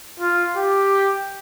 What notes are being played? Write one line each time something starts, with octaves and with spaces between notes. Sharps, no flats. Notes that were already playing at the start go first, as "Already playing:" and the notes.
F4
G4